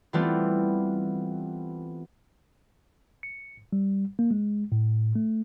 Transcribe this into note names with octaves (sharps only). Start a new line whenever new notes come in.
E3 G3 A3 B3 C4 F4
C#7
G3
A#3
G#3
A2
A3